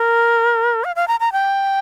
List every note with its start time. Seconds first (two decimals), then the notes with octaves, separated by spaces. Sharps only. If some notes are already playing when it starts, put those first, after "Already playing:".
Already playing: A#4
0.84 F5
0.96 F5
1.08 A#5
1.20 A#5
1.32 G5